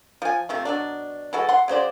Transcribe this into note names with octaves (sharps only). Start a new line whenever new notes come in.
F3 G#5
C3 F3 A3
B2 F#3 D4
E3 G#3 F#4 A4
F#5 C6
C#3 F#3 C5 D5